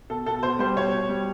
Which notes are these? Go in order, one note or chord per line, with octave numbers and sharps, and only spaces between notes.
B2 A4
B2 A4
B2 C5
G3 C5
B2 C#5
B2
G3